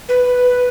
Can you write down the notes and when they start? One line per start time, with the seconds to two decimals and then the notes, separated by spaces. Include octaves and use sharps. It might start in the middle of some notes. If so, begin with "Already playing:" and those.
0.09 B4